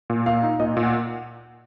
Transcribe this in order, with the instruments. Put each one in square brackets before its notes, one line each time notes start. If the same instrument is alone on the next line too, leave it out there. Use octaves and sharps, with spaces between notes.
[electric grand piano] A#2
[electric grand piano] A#2 [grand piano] F5
[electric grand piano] D#4
[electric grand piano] A#2 [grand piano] D#5
[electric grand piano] A#2
[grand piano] F#5